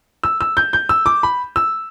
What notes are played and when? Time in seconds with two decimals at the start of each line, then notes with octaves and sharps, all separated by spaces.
0.23 E6
0.41 E6
0.57 G6
0.73 G6
0.89 E6
1.06 D6
1.23 B5
1.56 E6